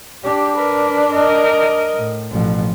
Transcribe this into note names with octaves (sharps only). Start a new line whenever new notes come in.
D4 G4
A#4 B4
A#4 D#5
A2
A1 B2 F3